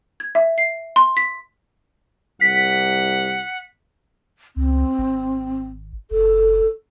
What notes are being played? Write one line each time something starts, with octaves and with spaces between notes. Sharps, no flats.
G#6
E5
C7
C6
B6
C2 F#5 B6
C#2 C4
G#1
F#1 A4